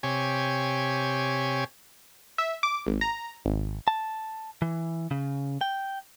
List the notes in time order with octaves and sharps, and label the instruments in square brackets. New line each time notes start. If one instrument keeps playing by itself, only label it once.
[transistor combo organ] C3 G4 C#5 G#5
[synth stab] E5
D6
G#1
A#5
G#1
[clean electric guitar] A5
E3
C#3
G5